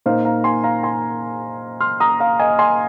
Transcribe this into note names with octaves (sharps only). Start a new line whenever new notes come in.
A#2 A#3 D#4 C5 F5
F5 A#5
G#5 C6
F5 A#5
G#5 C6
C6 F6
A#5 D#6
F5 A#5
D#5 G#5
G#5 C6